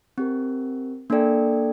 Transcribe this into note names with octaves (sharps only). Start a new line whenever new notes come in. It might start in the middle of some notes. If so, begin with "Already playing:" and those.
C4 G4 A#4
A#3 D4 A4 D5 G5